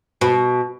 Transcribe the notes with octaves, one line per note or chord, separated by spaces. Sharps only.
B2